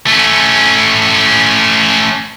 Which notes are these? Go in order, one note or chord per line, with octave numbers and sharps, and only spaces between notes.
A3 C#4